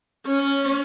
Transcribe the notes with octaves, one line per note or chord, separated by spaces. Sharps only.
C#4